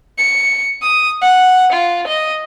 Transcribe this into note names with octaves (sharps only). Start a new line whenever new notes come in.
C#7
D#6
F#5
F4
D#5